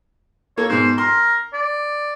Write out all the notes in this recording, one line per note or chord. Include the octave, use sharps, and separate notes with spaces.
A#3 A4 C#5
G#2 B2 C5
A#4 C6
D5